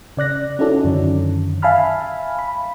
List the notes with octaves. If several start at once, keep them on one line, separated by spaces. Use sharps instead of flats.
C#3 D5 F#6 A#6
C#4 D#4 E4 F#4 A4 D5
F#2 D3 D#3 C#4
E5 F5 G#5 A5 B5 F6
B5